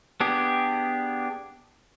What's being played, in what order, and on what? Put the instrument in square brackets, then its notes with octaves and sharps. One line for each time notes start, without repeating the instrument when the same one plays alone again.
[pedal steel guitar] B3 D4 G4 G#4